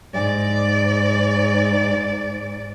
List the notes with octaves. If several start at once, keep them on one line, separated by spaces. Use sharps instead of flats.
G#2 D5